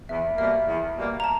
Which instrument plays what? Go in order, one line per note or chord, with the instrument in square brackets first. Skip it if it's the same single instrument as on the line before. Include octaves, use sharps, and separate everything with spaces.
[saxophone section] E2 [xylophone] E5
[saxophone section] B2 G3 A#3 [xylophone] E5
[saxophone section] E2
B2 G3 A#3
[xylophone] A#5
A5